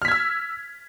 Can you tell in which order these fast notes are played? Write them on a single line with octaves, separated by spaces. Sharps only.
F6 B6 G#6 E6